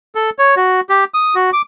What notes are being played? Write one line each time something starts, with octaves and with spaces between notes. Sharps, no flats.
A4
C#5
F#4
G4
D#6
F#4
D6